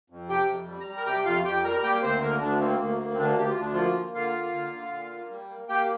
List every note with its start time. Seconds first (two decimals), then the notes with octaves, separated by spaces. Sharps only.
0.10 F2
0.29 C3 G4 G5
0.49 F2
0.68 G3
0.80 A#5
0.87 G3
0.97 A#4 A#5
1.06 C3 G4 G5
1.25 F2 F4 F5
1.45 F2 G4 G5
1.64 G3 A#4 A#5
1.83 A#3 G4 G5
2.02 D2 C4 C5
2.22 D3 A#3 A#4
2.41 D2 D3 D4
2.61 A#3 C4
2.80 D2 A#3
2.99 A#3
3.14 C4
3.18 D2 D3 D4
3.38 D2 G4
3.49 F4
3.57 D2 D4
3.73 F3 A#3 F4
3.96 A#3
4.15 D3 F4 F5
4.34 A#3
4.53 D3
4.73 D3
4.92 A#2
5.11 A#3
5.30 G3
5.49 A#3
5.69 A#3 G4 G5